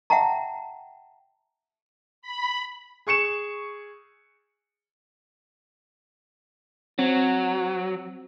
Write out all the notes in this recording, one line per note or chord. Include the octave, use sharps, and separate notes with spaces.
E5 F#5 G5 A5 A#5
B5
G#4 C#6 C#7 E7
F#3 C4